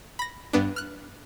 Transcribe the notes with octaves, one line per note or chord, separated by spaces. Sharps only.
B5 A#6
G2 B3 D4
F6 F#6